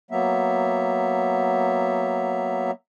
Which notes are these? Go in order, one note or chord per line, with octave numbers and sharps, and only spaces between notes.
F#3 A#3 B3 E5